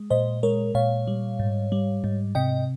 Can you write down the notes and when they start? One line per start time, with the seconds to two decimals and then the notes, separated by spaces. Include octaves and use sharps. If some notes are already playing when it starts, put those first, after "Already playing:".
Already playing: G#3
0.10 A#2 C5 D#5
0.43 G#3 A#4 C#5
0.75 A#2 C#5 F5
1.08 G3
1.40 G#2
1.72 G3
2.04 G#2
2.35 C3 D#5 G5